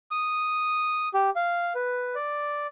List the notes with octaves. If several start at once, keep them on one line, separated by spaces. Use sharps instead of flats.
D#6
G4
F5
B4
D5